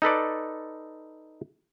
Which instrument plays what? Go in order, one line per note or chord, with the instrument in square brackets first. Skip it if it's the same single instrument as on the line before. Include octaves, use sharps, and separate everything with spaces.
[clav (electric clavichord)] D#4 A4 B4 D5